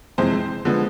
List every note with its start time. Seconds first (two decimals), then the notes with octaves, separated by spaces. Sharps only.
0.18 F2 C3 E3 G#3 C4 C5
0.65 D3 F3 G#3 B3